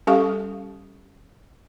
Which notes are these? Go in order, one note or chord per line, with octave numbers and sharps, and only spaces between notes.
G3 C#4 G4 A4 F5 C#6